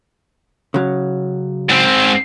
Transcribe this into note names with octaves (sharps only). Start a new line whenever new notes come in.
C#3 F#3
G#2 C4